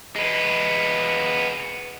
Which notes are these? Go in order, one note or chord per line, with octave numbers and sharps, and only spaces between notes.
G#3 B3